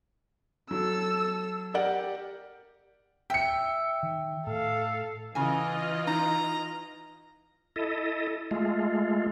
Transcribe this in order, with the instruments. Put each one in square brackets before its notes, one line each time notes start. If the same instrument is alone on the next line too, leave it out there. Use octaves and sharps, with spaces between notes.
[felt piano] F#3 [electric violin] A4 E6
[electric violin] G4 [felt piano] A#4 D5 F#5
[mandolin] E5 [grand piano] G5 C#7
[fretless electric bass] D#3
[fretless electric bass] A2 [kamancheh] A4 F5
[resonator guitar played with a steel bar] C#3 G#5 [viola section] E3 F4 D#5
[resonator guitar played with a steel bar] D#4 [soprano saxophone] A#5
[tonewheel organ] E4 A4 D#5
G#3 A3 F4